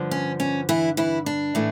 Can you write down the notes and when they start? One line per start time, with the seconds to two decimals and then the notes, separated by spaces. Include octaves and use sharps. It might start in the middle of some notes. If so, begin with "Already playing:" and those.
Already playing: G2 D3 F3
0.11 C#4
0.40 C#4
0.69 E3 E4
0.97 E3 E4
1.26 D4
1.55 A2 E3 A3